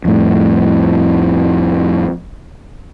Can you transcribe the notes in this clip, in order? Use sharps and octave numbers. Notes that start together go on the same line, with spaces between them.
F2 A2